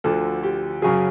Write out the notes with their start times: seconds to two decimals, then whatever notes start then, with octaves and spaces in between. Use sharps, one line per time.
0.04 D2 D3 F3 A4
0.43 G4
0.82 F#2 C#3 F#3 G#4